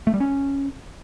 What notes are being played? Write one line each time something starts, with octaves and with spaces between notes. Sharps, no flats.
A3
G3
C#4